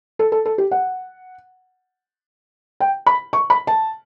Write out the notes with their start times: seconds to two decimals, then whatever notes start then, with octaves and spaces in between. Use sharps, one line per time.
0.19 A4
0.32 A4
0.45 A4
0.58 G4
0.71 F#5
2.80 G5
3.06 B5
3.33 C#6
3.50 B5
3.67 A5